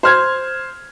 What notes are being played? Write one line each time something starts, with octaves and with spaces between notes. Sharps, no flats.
C5 F6 G#6